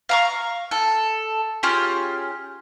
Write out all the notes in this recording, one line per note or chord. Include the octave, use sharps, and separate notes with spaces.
F5 A#5 C#6
A4
C#4 F4 G4 G#4